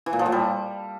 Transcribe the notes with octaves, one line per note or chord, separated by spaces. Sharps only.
E3
A#2
F3
A2
G3